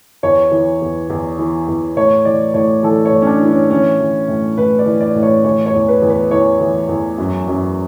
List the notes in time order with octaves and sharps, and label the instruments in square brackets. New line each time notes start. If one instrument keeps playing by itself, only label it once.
[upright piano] E2 C#5
E3
E2
E2
E3
E2
A2 C#5
E3 D5
A2 C#5
E3 A4
C#5
A2
C#4
D4
E3
C#4
E3 C#4
E3
A2
A2 B4
D5
E3
D5
A2
C#5
E3 C#5
C#5
E2
B4
E2
B4
E3 C#5
E3
E2
F#2
F#2